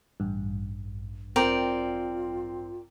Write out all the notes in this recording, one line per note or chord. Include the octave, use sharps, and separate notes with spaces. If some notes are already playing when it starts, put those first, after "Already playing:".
A1 G2
C4 F4 A#4 D5 G5